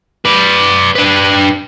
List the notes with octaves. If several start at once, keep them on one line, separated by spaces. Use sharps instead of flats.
B4 D5
D4 B4